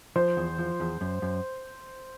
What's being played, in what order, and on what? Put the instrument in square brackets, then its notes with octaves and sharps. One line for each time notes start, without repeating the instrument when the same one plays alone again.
[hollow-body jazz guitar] F3 [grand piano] C5
[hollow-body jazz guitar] E2
F3
E2
F#2
F#2